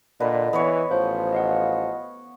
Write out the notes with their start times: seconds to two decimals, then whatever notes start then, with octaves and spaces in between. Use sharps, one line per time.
0.20 A#2 D3 B4 D#5
0.53 E3 B3 B4 C#5
0.91 A1 F3 C5
1.32 D#5 F5 F#5